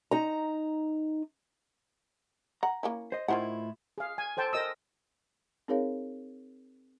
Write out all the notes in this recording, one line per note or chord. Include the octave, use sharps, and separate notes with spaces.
D#4 A#5
F#5 A#5
A#3 C#4 E4
C5 D#5
A2 D#3 E4 F4 C5 F#5
G#4 F5
G#5
A4 C5 G5 A5
A#4 D#5 D#6 E6
C4 D#4 G#4 A#4 C#5 F5